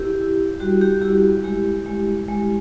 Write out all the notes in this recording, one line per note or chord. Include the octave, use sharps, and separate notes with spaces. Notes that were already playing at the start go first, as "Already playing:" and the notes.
Already playing: E4 G4
E4
G3 F#4
G4
E4 G4
G#3 G4
G#3
G#3